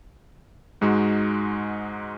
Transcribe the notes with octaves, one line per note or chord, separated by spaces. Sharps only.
G#2 G#3 D#4 F#4